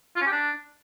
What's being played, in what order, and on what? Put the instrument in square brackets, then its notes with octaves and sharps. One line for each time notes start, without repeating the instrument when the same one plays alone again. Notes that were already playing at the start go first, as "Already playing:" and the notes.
[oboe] F4
C#4
G4
D4